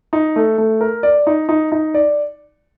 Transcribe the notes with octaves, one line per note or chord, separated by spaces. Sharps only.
D#4
A3
A3
A#4
D5
D#4
D#4
D#4
D5